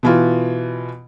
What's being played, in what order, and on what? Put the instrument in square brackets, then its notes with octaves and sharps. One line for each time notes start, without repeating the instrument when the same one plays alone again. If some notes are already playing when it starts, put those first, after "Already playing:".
[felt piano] B2 E3 F4